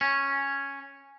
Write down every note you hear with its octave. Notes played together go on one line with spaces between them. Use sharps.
C#4